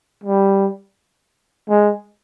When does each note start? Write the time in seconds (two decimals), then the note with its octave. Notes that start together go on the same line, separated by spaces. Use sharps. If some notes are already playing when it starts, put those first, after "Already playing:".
0.24 G3
1.69 G#3